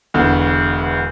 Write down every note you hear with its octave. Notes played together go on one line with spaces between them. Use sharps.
E1 E2 D3